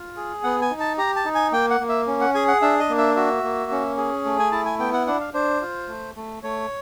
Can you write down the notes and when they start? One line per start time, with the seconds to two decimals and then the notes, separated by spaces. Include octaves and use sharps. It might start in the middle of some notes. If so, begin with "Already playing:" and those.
Already playing: F4
0.17 G#4
0.43 B3 F#5
0.61 G#5
0.71 D#4
0.80 A5
0.98 G4 A#5
1.16 A5
1.25 D#4
1.35 G#5
1.52 A#3 G5
1.70 F#5
1.80 A#3
1.89 E5
2.07 C#4
2.21 F#5
2.34 G#4 G#5
2.48 F#5
2.62 D4 E5
2.80 D#5
2.89 A#3
2.98 E5
3.15 F#4 E5
3.43 A#3
3.71 C#4
3.97 G#4
4.25 A3
4.39 G#5
4.52 E4 A5
4.65 G#5
4.79 B3 G5
4.93 F#5
5.07 D4 F#5
5.20 F5
5.34 D4 C5
5.62 F4
5.88 A3
6.16 A3
6.43 A3 C#5